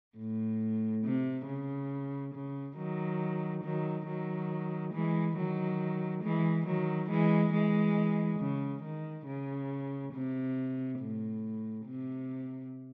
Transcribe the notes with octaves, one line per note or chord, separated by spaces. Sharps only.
A2
C3
C#3
C#3
D#3 F#3
D#3 F#3
D#3 F#3
E3 G#3
D#3 F#3
E3 G#3
D#3 F#3
E3 G#3
E3 G#3
C#3
D#3
C#3
C3
A2
C3